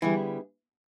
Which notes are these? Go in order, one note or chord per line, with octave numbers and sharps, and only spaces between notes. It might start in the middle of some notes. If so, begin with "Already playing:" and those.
D3 E3 G3 B3 E4 G#4